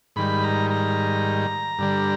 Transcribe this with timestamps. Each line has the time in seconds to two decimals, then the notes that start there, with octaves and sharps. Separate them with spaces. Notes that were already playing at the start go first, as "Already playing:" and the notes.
0.16 G#2 D#3 G3 B5
0.44 A#5
0.71 A#5
1.79 G2 D3 G3